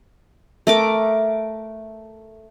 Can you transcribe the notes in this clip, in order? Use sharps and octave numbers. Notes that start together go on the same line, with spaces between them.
A3 A#4 D6